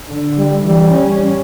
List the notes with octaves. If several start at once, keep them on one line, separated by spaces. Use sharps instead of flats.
D3
G3
E3 G3
C#4